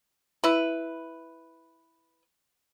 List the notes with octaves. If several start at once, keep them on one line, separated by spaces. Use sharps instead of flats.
E4 B4